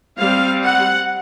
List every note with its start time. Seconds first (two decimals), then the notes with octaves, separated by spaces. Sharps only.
0.18 G3 C4 F5
0.63 F#5